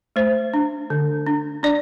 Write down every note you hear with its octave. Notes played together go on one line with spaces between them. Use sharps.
A3 C5
D4
D3
D4
D4 D5